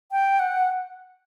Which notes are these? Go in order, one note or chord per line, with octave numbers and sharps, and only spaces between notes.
G5
F#5